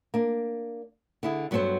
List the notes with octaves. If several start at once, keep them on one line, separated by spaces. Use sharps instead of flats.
A#3 D4
D3 E4 G#4
G2 F#3 B3 F4 A4 C5